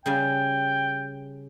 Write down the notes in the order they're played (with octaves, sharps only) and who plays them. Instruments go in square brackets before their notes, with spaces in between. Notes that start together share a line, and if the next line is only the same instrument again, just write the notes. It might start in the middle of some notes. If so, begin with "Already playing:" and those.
[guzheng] C#3 G3 G#5 [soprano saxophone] G5